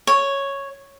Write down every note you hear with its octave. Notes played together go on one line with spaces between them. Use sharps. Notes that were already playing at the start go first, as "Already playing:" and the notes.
C#5